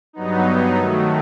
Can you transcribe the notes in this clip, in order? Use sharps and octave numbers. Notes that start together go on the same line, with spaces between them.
G2 F#3 B3 D#4
D#3 F#3 A3